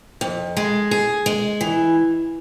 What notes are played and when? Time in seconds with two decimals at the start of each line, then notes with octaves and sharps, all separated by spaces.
0.21 F2
0.57 G#3
0.91 G#4
1.26 G#3
1.61 E3